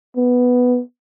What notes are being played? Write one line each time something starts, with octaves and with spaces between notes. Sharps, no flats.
B3